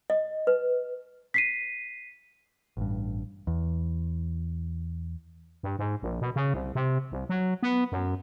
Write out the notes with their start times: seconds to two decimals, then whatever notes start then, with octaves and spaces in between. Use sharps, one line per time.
0.10 D#5
0.47 B4
1.34 B6 C7 D#7
2.77 A1 G2
3.47 E2
5.63 G2
5.79 G#2
6.03 A#1
6.21 B2
6.36 C#3
6.54 C2
6.75 C3
7.12 C2
7.29 F#3
7.63 B3
7.92 F#2